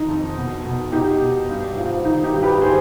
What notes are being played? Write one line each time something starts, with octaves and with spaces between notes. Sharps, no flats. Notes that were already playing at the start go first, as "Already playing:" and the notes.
Already playing: D#3 D#4
F2
B2
B2
B2 D#4 G4
B2
G2
F3
D#3 D#4
D#4 G4
G2
G4 B4
D#3 G#4 C5